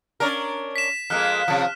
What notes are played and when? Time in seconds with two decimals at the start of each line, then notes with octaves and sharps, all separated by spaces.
0.20 C#4 D4 A#4
0.76 B6 E7
1.10 F2 G#3 A#3 F6 F#6
1.48 C3 F3